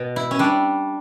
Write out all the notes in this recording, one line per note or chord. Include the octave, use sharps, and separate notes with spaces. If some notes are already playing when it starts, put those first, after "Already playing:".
Already playing: B2
E4
C#4
G3 D4